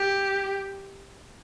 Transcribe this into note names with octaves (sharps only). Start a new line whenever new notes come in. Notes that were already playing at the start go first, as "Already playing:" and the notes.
Already playing: G4